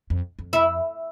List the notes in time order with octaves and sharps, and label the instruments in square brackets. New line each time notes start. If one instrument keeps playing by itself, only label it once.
[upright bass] F2
F2
[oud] E4